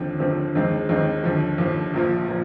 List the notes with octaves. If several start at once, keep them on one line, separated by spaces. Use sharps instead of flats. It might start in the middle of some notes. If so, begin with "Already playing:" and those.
Already playing: D#2 D3 F3 C4
D#2 D3 F3 C4
D#2 D#3 G#3 C4
D#2 D#3 G#3 C4
D#2 D3 F3
D#2 D3 F3
A#1 A#2 F3
A#2 F3